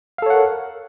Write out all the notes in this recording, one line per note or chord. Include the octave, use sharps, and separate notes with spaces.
A4 A#4 C#5 F5 F#5